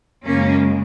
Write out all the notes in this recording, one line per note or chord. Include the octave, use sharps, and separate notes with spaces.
F#2 C#3 G#3 A#3 C#4